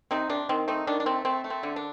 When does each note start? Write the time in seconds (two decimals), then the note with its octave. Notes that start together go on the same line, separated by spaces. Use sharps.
0.11 C3 C4 D#4
0.30 C3 D4
0.49 D#3 C4
0.68 A3 C4 D#4
0.87 D#3 D4
1.00 D4
1.06 A3 C4
1.25 A3 C4
1.44 A3
1.50 C4
1.63 D3
1.76 D4